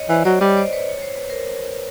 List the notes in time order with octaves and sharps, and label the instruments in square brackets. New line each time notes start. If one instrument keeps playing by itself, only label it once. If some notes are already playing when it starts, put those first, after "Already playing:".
Already playing: [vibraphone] C#5 D#5
[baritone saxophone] E3 [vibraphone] C5 D5
[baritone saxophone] F#3 [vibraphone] C5 D5
[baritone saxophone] G3 [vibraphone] C#5 D#5
[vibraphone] C5 D5
B4 C#5
C#5
C5
B4
A#4 C5